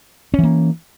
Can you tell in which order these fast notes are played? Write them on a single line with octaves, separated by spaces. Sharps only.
C#4 E3 A#3